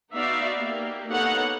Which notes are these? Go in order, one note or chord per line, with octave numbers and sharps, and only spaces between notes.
B3 D#4 F#4 D5 E5 F5
A#3 G4
A#3 B3 D#4 A4 C#5 F#5